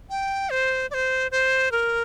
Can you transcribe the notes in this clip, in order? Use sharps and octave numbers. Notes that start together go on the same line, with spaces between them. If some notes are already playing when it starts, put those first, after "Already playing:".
G5
C5
D5
C5
C5
A#4